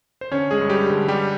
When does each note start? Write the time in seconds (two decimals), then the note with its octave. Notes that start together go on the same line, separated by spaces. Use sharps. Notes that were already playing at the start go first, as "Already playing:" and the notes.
0.21 C5
0.31 D3 C#4 C#5
0.51 G#3 G#4
0.61 G2
0.70 G3 G4
0.90 D3
1.08 G3 G4